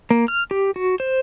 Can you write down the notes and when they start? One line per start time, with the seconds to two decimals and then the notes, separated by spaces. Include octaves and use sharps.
0.10 A#3
0.28 F6
0.51 G4
0.76 F#4
1.00 C5